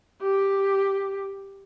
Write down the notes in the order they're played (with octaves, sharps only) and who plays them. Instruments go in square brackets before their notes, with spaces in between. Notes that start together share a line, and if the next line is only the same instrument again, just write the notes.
[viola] G4